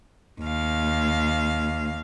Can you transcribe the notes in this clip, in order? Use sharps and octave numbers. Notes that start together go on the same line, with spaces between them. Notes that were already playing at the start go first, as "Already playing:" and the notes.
D#2 F5